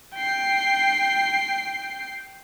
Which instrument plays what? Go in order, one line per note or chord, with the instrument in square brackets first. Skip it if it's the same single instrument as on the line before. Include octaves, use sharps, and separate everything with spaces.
[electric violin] G5 C7